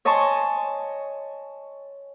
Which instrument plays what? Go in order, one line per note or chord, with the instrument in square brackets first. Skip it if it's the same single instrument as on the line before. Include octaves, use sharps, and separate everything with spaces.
[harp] C#5 D#5 G#5 A5 C6 C#6